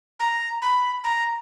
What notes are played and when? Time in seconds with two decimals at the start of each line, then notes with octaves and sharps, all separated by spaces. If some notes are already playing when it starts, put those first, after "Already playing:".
0.20 A#5
0.62 B5
1.04 A#5